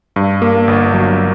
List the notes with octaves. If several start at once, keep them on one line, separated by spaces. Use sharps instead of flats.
G2
A#3
G1
F#3